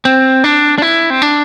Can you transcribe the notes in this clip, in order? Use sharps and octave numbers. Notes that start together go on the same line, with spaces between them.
C4
D4
D4
E4
C4
D4